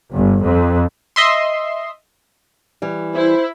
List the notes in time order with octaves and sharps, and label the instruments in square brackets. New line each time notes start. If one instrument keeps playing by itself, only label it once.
[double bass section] G1
F2
[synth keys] D#5 E5 C6
[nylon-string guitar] E3 G3
[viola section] E4 [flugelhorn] C5